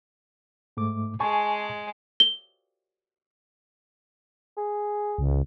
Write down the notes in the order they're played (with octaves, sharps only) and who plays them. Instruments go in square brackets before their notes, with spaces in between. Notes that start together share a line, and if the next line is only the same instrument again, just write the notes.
[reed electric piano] G#2 A3 D6
[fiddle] G#3 G#4 [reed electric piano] G#5 A5 C#6
[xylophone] G7
[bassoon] G#4
[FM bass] C#2